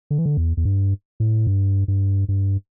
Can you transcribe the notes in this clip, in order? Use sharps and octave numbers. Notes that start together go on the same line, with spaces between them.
D3
E3
D3
E2
E2
G2
A2
G2
G2
G2